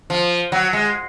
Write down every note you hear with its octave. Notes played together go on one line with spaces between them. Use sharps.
F3
F#3
G#3